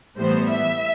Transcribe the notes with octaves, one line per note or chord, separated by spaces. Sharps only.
A2 E3 G3 B3 C5
E5